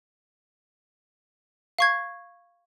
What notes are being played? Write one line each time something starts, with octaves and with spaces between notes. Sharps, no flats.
F5 C#6 G#6